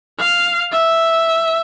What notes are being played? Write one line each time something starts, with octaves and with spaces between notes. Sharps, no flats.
F5
E5